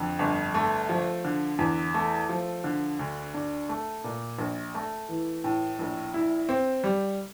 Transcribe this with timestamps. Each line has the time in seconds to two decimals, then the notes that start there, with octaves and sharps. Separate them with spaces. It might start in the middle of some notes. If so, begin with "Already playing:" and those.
Already playing: F2 D3
0.19 G1
0.54 A3
0.89 F3
1.25 D3
1.59 E2
1.94 A3
2.29 F3
2.64 D3
2.99 D2
3.34 D4
3.69 A3
4.04 A#2
4.39 A#1
4.75 A3
5.09 E3
5.44 A2
5.79 A#1
6.14 E4
6.49 C4
6.84 G3